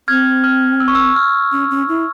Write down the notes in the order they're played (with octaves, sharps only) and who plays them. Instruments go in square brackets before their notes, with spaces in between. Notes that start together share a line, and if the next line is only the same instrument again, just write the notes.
[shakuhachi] C4 [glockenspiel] F6 G#6
[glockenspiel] F6
E6
C#6
E6
F6
[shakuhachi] C#4
C#4
E4